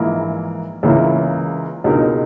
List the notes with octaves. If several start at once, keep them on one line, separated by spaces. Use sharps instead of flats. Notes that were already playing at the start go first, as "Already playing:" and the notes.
Already playing: A#1 G#2 E3 A#3 E4
C#2 C#3 E3 A#3 E4
C#2 B2 G#3 D#4 A#4